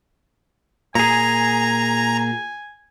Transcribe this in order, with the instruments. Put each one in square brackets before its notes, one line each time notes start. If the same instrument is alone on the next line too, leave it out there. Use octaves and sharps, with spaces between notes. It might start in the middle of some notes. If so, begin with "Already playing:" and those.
[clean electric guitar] A#2 G#4 [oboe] G#5 [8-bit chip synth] A#5